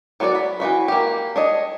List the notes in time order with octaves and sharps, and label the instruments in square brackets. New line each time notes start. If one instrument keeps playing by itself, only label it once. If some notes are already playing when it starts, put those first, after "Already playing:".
[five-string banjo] F#3 B3 F#4 G#4 D5
B5
E3 F3 F#4 B5
A#3 G4
D4 C#5 D#5